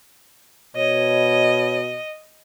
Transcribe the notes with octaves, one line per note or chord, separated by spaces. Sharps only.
B2 C#5 D#5